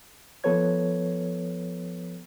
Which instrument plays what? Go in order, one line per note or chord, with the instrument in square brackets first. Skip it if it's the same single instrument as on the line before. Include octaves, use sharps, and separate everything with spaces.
[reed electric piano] F3 B3 A4 B4 C#5 G#6